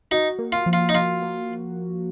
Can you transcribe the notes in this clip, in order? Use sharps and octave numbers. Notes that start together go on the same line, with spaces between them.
D#4 F#4
A#3
F4
F3
F4
D#4
F3 F4
A#3